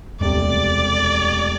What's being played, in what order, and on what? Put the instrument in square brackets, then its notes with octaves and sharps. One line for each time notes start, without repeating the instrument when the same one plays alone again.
[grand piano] E1 D2 C3 G3 [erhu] D5